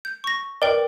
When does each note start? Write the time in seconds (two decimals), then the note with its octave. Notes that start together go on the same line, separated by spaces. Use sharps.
0.05 G6
0.24 C#6 A#6
0.62 A#4 B4 D5 G5